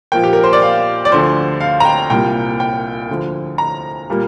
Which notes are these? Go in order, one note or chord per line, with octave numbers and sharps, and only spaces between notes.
A#2 F3 A#3 G5
G4
A#4
C5
D5
F5
D5
D2 D3 F3 C5
F5
A#5
G5
C2 A#2 G3 A#3 G5
G5
D2 D3 F3
A#5
A#2 G3 A#3